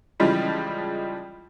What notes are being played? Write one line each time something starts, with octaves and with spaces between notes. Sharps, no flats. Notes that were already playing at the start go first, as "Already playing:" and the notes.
C#3 E3 F3 G3 G#3